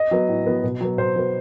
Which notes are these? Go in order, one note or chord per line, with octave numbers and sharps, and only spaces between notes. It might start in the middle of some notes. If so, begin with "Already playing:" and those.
Already playing: D#5
F#3 B3
A2
F#3 B3
B2
F#3 B3
B2 C5
F#3 B3